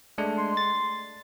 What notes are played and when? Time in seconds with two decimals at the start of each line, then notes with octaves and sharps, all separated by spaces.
0.18 G#3 A3 D4
0.38 C6
0.57 A6